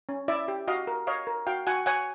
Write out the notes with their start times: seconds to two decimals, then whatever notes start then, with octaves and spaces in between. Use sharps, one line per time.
0.09 C#4
0.28 E4 D5 E5
0.48 G4
0.68 F#4 D#5 F5
0.87 A#4
1.07 C#5 D#5 F5
1.27 A#4
1.47 F#4 F5 G5
1.67 F#4 F#5 G#5
1.86 C#5 F#5 G#5